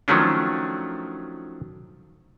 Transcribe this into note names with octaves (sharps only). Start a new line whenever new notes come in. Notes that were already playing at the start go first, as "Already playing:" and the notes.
D#3 F3 F#3 A3 C#4 D4